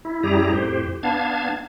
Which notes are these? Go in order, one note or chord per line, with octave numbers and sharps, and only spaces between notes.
E4
F#2 G3 E4 G4 G#4 A#5
F2 A2 G4 C5
B3 D4 F5 A5 G#6